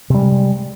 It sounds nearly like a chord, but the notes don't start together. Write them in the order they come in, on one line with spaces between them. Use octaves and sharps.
C3 G3 G#3